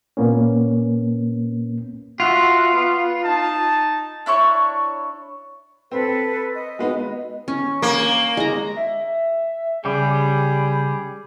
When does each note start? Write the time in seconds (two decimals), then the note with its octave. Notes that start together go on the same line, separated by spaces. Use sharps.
0.17 A#2 A#3 B3 C#4
2.20 F4 F#4 E5 F#5
2.71 B3
3.23 D#4 A5
4.26 D4 E4 C#5 C#6
5.92 C4 A4 B4
6.55 D#5
6.79 G#3 B3 D#4
7.48 C#4
7.82 A#3
8.37 G#3 A#5
8.76 E5
9.85 C#3 G3 G4 G#4 B5